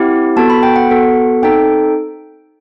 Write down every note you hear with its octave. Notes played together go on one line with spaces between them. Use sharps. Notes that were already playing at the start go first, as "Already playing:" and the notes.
Already playing: C4 E4 G4 F#5
B3 F#4 A4 A5
B5
G5
F#5
B3 F#4 A4
C4 D#4 A4 G5